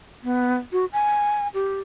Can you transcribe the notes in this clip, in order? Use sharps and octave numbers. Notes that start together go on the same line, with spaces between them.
B3
F#4
G#5
G4